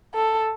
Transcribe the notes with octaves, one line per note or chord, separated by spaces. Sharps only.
A4